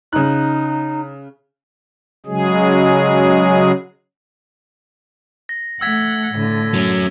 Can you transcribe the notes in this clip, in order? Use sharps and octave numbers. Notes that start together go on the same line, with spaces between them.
C#3 D#4 F#6
C#3 F#3 G#3 G#4
A#6
A3 F#5 E6 G#6 B6
A2 D3
F#3 C#4